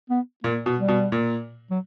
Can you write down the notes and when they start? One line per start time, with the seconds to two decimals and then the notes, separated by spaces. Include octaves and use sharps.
0.10 B3
0.44 A#2 A#3
0.66 B2
0.78 G3
0.88 B2
1.12 A#2
1.71 F#3